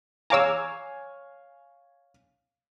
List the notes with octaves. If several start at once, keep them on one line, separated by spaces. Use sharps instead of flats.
C#5 F5 G#5 A#5 D6 E6